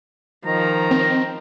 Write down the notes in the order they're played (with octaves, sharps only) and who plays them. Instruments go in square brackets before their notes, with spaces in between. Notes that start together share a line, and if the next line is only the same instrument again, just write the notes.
[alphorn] D#3 [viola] F3 [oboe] A#5
[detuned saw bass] C4